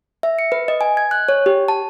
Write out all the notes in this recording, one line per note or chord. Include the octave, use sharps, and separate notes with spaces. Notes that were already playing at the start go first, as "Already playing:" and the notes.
E5
C#7
B4
D#5
G#5
G#6
F#6
C#5
G4
A5